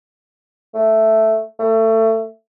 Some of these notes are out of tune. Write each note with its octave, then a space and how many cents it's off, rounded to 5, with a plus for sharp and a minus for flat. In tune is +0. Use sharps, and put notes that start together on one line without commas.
A3 +0
A3 +25